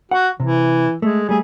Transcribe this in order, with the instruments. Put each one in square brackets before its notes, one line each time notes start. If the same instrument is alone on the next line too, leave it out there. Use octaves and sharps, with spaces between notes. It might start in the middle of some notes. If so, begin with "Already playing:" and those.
[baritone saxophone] F#4 [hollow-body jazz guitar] F#5
[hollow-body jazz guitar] C3 [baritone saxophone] E3
[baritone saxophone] G#3 [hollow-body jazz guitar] A3
[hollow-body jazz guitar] G3 A3 [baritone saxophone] G#4